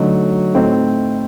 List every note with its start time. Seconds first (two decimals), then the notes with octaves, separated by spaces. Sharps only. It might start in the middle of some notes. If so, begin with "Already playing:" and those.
Already playing: D3 F#3 A3 D#4
0.54 A2 A3 C4 D#4